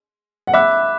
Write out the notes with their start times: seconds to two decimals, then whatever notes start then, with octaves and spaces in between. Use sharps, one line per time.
0.47 F#5
0.54 E5 B5 D6 F#6